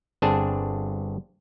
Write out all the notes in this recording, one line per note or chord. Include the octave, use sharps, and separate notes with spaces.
G1 C4 D4 G#4 A5